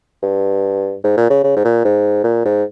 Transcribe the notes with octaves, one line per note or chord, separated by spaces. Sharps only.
G2
G#2
A#2
C#3
C#3
G#2
A#2
G#2
A#2
G#2